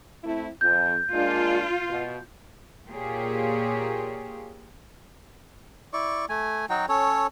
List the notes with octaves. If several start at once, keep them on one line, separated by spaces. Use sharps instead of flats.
A3 C4 E4
F2 G6
G#3 A#3 D4 F4
B2
A#2 A#3 F4 G4 G#4 C#5
E4 D5 C#6
A3 G#5
F#3 D#4 F#4 G5
C#4 A4 C#5